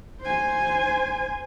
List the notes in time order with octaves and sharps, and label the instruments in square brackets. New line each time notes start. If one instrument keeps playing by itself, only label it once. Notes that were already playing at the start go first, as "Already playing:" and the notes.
[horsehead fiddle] C5 G#5